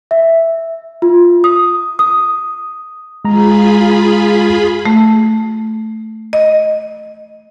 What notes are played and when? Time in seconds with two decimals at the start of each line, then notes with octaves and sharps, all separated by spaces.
0.11 E5
1.02 F4
1.44 D#6
1.99 D#6
3.25 G#3 F4 G#4 A#5 B5
4.86 A3
6.33 D#5